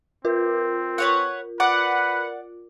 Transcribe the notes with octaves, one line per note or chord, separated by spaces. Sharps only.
C4 F4 A#4
B4 C#5 F#5
B4 D5 F#5